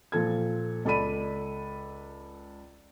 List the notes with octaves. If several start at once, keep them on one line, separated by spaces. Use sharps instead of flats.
A#2 F3 A4 G#6
C#2 A4 D5 B5 D#7